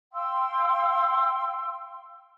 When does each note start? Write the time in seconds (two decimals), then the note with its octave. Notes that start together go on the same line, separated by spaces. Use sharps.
0.13 F5 G5 C6 E6